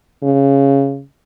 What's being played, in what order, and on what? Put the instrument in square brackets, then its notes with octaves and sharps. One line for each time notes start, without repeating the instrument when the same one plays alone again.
[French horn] C#3